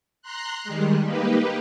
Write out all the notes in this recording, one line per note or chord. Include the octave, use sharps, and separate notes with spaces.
A#5 C6 F#6
D#3 G3 G#3
A#3 D#4 G4 B4